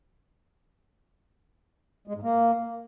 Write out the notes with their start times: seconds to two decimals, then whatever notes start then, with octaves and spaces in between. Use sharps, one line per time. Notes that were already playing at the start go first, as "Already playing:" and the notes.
2.08 G#3
2.15 G#2
2.23 A#3